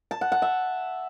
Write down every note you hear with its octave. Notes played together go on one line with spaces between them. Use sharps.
A5
F#5
F#5
E5